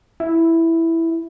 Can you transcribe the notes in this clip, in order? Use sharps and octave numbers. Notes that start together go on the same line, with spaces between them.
E4